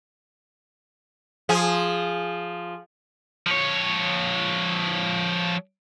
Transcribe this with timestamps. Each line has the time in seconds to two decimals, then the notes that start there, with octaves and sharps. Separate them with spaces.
1.49 F3 G#4
3.47 F3 C#5